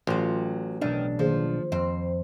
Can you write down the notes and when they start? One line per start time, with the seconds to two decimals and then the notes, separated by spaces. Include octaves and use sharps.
0.07 A1 F#3 F4
0.82 B1 D#3 D4
1.19 D#3 F3 A#3 G#4
1.72 F2 C4